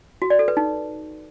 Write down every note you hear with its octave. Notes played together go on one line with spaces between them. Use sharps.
F#4
D5
A4
B4
D#4